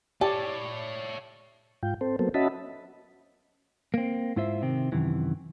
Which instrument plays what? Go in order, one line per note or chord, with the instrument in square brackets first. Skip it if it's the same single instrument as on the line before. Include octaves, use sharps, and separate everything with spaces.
[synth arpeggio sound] G4 [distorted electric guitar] A4 C#5 [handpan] D5 [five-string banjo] A5
[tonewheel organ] G#2 F4 G5
C4 A4 C5
F#3 A#3 B3 A4 C5
C#4 F#4 D#5 E5 A5 B5
[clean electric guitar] A#3 C4
G#2 E4 F4 C5 E5
C3 D#3 C4
F#2 C3 D#3 E3